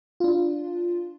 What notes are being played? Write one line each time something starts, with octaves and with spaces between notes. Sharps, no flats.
D4 F4